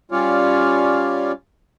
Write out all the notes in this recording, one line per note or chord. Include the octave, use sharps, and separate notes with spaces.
G3 C#4 F4 C#5 D5 F5